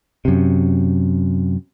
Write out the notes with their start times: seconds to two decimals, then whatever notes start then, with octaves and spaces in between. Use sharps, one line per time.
0.25 F#2 C3